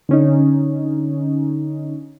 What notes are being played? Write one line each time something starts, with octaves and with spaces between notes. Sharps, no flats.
D3 C#4 D#4